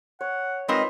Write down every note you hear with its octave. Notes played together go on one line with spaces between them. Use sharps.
C#5 F#5
G#3 C4 D#4 F4 A#4 B4 D#5 B5